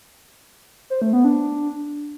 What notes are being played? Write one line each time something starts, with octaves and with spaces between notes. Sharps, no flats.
C5
A3
B3
D4